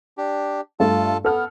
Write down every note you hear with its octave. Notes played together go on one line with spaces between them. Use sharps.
D4 G4
G2 A3 F4 A4 A5
B3 A4 F6